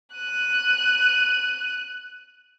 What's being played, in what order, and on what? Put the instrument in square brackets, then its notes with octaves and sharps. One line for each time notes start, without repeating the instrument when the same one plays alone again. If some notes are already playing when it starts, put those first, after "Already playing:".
[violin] F#6 D#7